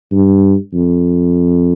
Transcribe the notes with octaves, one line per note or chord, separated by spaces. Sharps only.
G2
F2